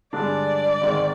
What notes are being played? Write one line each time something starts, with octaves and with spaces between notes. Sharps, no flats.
G2 D3 G#3 D4 D5
G#1 G#2 D#3